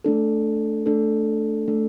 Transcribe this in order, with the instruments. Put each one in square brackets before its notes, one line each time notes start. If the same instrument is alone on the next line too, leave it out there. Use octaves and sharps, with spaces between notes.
[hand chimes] A3 D4 A4
A3 D4 A4
A3 D4 A4